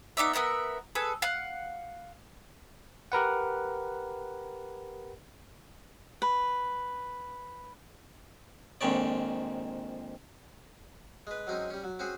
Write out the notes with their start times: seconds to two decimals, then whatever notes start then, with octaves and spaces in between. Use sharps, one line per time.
0.17 B3 D#4 D5 E5
0.33 B3 A#4 E5 F#5
0.95 G#4 A4 B4
1.22 F5 F#5
3.12 G4 A#4 B4 F#5
6.22 B4
8.81 A#1 F2 G#2 D#3 C#5 D5
11.27 G#3 B4
11.47 F#3 G#3 C4 C#4 D#4
11.70 G3 C#4
11.84 F#3
11.99 C4 C#4 F#4 G#4